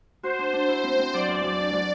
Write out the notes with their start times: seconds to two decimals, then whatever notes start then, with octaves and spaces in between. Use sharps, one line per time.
0.23 F#4 C5
0.39 D4
0.53 D4
0.68 E4
0.84 C4
0.99 C4
1.14 F#3 D5
1.28 E2
1.43 F#3
1.59 D4
1.73 F#3